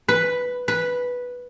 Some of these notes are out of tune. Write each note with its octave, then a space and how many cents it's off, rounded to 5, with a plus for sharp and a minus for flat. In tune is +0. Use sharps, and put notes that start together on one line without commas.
B4 +0
B4 -5